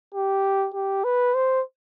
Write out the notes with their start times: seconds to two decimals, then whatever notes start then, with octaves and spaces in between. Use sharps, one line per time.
0.15 G4
0.74 G4
1.04 B4
1.34 C5